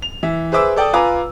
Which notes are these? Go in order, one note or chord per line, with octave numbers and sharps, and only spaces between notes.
F7
E3 E5
G#4 B4 C5 E5 D6 E6
A4 D5 G5 A5 D#6
F4 B4 F5 G#5 A#5 D6